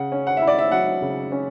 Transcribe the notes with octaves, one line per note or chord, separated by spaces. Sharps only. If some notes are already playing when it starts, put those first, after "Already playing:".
Already playing: C#3 F#5
C#4
F#5
E4 E5
D5
E5
F#3 F#5
C#3
C#4